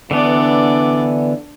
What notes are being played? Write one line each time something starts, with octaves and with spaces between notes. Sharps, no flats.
D3 E3 B3 D4 D5